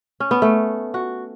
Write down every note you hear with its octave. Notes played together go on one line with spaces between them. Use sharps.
C#4
B3
A3
F#4